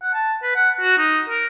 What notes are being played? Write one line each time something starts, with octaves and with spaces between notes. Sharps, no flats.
F#5
A5
B4
F#5
F#4
D#4
A#4